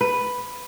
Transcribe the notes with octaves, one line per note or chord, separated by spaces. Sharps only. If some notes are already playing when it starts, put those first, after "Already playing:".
B4